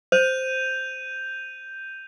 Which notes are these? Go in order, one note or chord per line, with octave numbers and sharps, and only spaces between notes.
C5 G6 D#7 F7